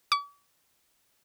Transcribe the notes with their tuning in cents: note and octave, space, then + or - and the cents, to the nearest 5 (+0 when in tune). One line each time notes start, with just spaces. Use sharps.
D6 -45